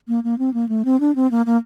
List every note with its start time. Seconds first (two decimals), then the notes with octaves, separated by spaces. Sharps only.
0.08 A#3
0.24 A#3
0.38 C4
0.54 A#3
0.69 A3
0.85 C4
1.00 D4
1.16 C4
1.31 A#3
1.46 A#3